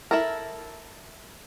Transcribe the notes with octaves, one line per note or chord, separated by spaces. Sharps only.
E4 A4 A#4